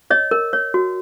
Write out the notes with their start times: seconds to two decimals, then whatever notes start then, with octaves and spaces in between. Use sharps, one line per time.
0.10 C#5 D#5
0.31 A#4
0.53 C#5
0.74 F#4